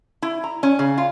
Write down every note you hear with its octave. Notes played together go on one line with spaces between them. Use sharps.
E4
A#5
C#4
C#3
F4